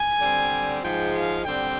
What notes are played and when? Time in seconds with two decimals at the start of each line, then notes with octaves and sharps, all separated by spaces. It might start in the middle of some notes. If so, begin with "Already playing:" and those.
Already playing: G#5
0.19 D3 G3 C4
0.82 G#2 F3 G#3 G5
1.13 F5
1.45 D3 G3 C4 G5